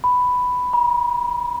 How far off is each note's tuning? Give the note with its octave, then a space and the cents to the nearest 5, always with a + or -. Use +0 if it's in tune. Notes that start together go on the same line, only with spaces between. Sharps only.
B5 +5
B5 -45